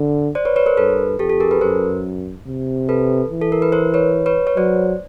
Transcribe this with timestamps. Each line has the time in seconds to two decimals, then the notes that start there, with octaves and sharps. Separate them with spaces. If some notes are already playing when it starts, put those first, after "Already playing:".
Already playing: D3
0.35 C5 D5
0.45 B4 C#5
0.56 B4 C#5
0.66 A#4 C5
0.77 G2 A4 B4
1.19 F2 G4 A4
1.29 G4 A4
1.40 G#4 A#4
1.51 A4 B4
1.61 F#2 A#4 C5
2.46 C3
2.89 A4 B4
3.30 E3
3.42 A4
3.52 A#4
3.62 B4
3.72 A#4 C5
3.94 B4 C#5
4.26 B4 C#5
4.47 B4 C#5
4.57 F#3 C5 D5